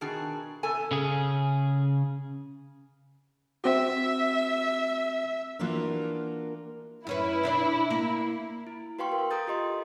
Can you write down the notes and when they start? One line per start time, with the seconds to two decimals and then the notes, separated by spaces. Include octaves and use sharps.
0.01 B2 D#3 D4 F#4 G#4
0.63 C3 B3 A4 G#5
0.91 C#3 G#4
3.64 C4 F#4 E5
5.59 E3 A#3 D4 F4 F#4 A#4
7.07 F#2 C#4 E4 B4
7.43 B2 D4 D5
7.90 A#3
8.67 E4
8.99 F#4 B4 F5 G5 C6 C#6
9.12 A#4
9.31 A4 A#5 D#6 G6 A6
9.48 F4 G4 D#5 C6